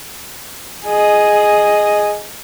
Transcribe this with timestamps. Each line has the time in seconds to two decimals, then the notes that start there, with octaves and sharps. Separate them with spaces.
0.86 G#4 D#5